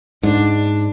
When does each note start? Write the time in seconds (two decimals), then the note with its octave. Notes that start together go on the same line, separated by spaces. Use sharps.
0.23 G#2 D4